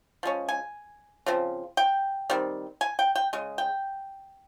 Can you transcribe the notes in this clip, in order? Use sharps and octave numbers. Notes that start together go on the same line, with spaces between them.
F3 G#3 C#4
G#5
C#3 F3 C4
G5
D#3 G3 C4
G#5
G5
G5
C#3 G#3
G5